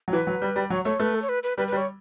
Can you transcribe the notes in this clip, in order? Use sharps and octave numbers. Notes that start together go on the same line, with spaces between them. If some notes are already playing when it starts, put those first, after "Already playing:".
F#3
E3 B4
F#3
G3
G3
F#3 C#5
A3 C#5
A3 B4
A4
C#5
B4
B4
G3 B4
B4
G3
C#5